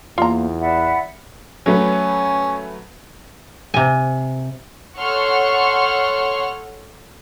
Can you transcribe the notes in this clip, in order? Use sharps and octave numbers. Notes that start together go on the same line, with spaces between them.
E2 A#3 F4 A#5
D5 E5 F#5 B5
F#3 A3 C#4 B4
C3 G#5
A4 C#5 F#5 C6 C#6 F6